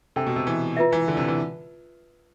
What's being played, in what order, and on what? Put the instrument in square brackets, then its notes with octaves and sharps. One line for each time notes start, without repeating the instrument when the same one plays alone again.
[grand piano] C3 [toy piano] D4 A4 E5 G5
[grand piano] B2
C3
E3
[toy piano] F4 B4 E5
[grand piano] E3
D3
C3
E3